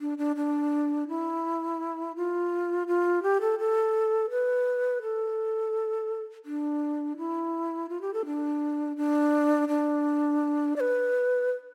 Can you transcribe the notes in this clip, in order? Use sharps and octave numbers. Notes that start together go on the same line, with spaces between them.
D4
D4
D4
E4
F4
F4
G4
A4
A4
B4
A4
D4
E4
F4
G4
A4
D4
D4
D4
D5
B4